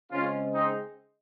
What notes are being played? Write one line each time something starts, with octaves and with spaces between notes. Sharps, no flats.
C#3 G#3 C4 C#4 F4
C4 D#4